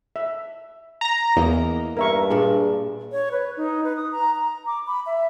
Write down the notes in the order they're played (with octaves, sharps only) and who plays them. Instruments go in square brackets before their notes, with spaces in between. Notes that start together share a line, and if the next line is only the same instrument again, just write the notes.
[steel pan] E5
[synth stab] A#5 A#6
[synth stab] E2 [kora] A#3 G#4 D#5
[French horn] G2 [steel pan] A#4 E5 C#6
[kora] A#2 D4 [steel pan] G#4
[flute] C#5
B4
D#4
B4
D#6
A#5
A#5
D6
B5
E5